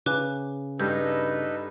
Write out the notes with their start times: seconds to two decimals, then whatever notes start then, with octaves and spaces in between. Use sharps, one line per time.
0.06 C#3 B4 D6 F#6
0.80 G2 D#4 A4 B4 G6